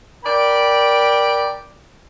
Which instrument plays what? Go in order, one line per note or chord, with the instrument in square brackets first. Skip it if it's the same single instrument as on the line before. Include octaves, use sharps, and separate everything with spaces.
[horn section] A#4 D5 G5 B5